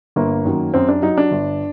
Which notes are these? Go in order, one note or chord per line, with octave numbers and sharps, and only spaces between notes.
G1 A#3
F#2 D#3 F#3
F#2 C4
D4
F#3 D#4
D4
G1